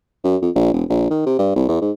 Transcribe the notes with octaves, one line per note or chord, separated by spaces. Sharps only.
F#2
F2
A#1
E1
A#1
D#3
C3
G2
C2
E2
G#2